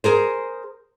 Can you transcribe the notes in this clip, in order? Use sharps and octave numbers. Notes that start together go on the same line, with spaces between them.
G#4 A#4 C5